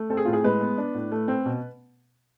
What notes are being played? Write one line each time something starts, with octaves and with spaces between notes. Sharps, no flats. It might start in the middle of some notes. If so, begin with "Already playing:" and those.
Already playing: A3
C4 A4
G#4
A2 F4
G#4
G#3 B4
B3
D4
A2
A3
C4
B2